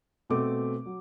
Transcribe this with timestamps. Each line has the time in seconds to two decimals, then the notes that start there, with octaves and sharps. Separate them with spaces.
0.30 B2 A3 C4 D6
0.86 F#3